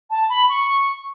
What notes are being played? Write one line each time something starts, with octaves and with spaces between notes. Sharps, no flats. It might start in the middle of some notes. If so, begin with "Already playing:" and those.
A5
B5
C#6